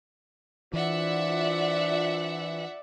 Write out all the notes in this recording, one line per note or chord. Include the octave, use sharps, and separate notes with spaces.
E3 D4 F4 C5 D5 E5 F#5